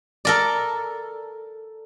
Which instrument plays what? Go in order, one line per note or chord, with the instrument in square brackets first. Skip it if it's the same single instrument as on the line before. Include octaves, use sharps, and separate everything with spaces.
[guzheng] A4 A#4 D5